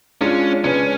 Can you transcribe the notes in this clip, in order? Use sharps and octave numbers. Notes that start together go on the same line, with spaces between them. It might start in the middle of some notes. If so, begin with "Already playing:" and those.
G#3 C#4 D4 F4 G#4 D5
C#3 G#3 C#4 D4 G#4 B4